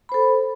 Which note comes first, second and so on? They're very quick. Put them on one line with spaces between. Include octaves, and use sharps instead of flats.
B5 C5 A4